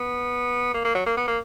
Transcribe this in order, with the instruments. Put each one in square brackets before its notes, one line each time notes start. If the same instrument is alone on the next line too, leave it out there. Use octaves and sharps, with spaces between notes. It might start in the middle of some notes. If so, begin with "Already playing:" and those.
Already playing: [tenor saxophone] B3
A#3
A#3
F#3
A#3
B3
A#3